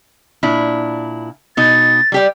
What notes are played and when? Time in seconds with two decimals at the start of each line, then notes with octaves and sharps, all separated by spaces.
0.43 A#2 D4 E4
1.57 B2 D#4 A6
2.12 G3 G4 D5